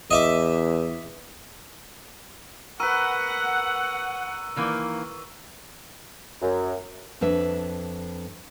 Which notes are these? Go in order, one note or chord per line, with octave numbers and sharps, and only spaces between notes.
E2 D#5 E5 D6
A#4 B4 F#5 C#6 E6 D#7
D#3 E3 A#3
F#2
F2 D4 B4 E5